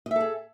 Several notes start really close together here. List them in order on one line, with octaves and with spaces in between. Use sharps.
D#5 E5 A4 G#4